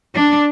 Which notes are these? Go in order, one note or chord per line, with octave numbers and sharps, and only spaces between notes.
D4